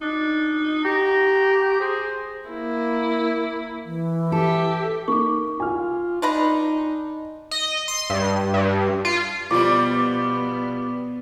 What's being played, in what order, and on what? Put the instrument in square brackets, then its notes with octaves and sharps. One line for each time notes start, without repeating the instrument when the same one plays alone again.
[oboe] D4 [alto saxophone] D#4
[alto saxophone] G4 [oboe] A#5
[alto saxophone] G#4 [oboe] C5
[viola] A#3 E4
[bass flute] E3
[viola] G4 E5 [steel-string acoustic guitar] A4
[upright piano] A#3 D#4 [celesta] C#6 D6
[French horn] F4 [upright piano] G#5 F6
[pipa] D4 B4 A#5 [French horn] D#4 [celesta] C6
[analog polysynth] D#5
C6
G2
G2
F4
[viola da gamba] B2 B3 [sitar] F3 G3 [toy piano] F4 G4 [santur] D5